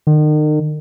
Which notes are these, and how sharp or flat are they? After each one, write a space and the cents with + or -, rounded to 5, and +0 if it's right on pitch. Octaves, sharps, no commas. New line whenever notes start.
D#3 -40